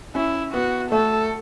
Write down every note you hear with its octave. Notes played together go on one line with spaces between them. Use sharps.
C#4 E4
B3 F#4
A3 A4